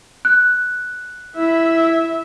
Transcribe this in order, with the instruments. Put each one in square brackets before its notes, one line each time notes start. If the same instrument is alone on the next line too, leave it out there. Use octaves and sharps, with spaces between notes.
[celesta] F#6
[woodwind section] E4 [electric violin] E5